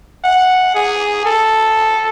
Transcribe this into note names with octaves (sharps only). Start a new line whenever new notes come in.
F#5
G#4
A4